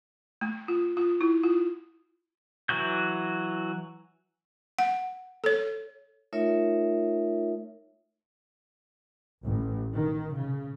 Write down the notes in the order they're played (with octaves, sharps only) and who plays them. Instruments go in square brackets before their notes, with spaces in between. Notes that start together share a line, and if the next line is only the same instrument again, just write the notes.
[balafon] A3
F4
F4
E4
F4
[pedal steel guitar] E3 F#3 F#4 G6
[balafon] F#5
A4 C#5
[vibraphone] A3 D#4 F4 A#4 C#5 E5
[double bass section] A1
D#3
C#3